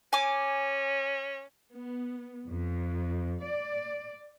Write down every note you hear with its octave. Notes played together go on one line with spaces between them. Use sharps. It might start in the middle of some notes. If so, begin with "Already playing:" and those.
C#4 G#5 D6
B3
F2
D5